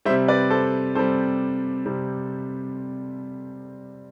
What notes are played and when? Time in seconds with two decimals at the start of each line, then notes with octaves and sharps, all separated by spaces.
0.05 G3 C5 E5
0.10 C3
0.28 B4 D5
0.50 A4 C5
0.95 C3 G3 A4 C5
1.86 C3 G3